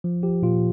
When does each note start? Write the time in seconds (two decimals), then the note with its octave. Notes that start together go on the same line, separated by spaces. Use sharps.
0.04 F3
0.23 F3 G4
0.42 A#2 F4